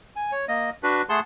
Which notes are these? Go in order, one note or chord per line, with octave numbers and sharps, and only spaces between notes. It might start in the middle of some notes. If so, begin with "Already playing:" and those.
G#5
C#5
A#3 D#5
D4 F#4 B4
A3 G#4 F#5 A5 C6